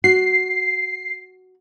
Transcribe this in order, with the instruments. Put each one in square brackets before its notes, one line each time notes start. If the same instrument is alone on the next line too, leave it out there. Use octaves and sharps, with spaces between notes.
[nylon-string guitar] F#4 [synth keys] C7